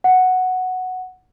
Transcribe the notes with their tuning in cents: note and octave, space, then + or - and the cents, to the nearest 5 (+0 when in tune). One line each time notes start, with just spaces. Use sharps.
F#5 +0